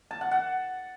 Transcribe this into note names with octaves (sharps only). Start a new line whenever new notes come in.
A5
F#5
F#5